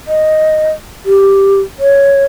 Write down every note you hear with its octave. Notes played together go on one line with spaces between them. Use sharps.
D#5
G4
C#5